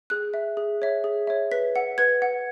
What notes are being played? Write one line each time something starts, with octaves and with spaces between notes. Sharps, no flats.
G#4 F#6
E5
G#4
C#5 E5
G#4
C#5 E5
B4 B6
F#5
B4 G#6
F#5